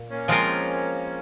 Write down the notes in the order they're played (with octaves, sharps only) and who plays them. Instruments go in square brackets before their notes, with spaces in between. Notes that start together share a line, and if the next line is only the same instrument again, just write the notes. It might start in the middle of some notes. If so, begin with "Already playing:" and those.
Already playing: [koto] A#2
[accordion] A#3 C#4
[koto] F3 G#3 C4 F4 A#4